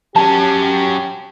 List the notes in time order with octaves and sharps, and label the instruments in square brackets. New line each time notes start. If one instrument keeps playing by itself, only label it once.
[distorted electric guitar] F#3 C#4 [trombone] G4 [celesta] A5